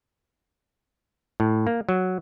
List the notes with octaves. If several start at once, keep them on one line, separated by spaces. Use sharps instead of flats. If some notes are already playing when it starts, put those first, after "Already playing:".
A2
A#3
F#3